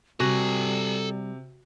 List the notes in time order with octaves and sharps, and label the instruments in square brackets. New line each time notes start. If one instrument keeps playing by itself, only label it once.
[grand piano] C3 [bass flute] G3 [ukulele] F#4 [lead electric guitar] A4 G#5